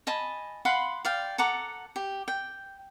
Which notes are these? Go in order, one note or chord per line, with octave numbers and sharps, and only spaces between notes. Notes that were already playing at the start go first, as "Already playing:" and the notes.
D#5 G#5 A5 B5
F5 F#5 B5 C6
D5 F5 G5
A4 F#5 A#5 D6
G4
G5